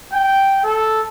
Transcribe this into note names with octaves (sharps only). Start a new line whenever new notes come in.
G5
A4